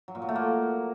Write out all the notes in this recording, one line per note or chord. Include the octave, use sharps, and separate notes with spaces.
F#3
A#2
F#3
A3
A#3